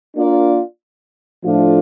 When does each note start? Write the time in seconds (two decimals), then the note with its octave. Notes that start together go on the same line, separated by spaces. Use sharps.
0.15 A#3 D4 F4 A#4 D5
1.44 A2 F3 A3 D4 F4